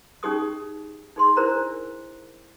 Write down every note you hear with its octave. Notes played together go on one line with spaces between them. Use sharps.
C#4 D#4 G4 G#4 C#6 D#6
D#4 G#4 C6
D4 E4 A#4 C5 A#5